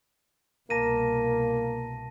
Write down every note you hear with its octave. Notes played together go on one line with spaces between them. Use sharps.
C2 B2 A#3 A5 A#6 D#7